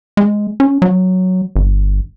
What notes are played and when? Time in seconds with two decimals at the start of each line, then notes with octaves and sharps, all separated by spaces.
0.17 G#3
0.60 C#4
0.82 F#3
1.56 G1